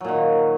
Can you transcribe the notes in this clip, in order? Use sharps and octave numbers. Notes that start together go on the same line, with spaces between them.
A#2 D#3 F#3